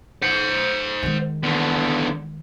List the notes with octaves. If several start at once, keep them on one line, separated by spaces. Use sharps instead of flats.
C5 F#5
D#3 G#3
E2 D3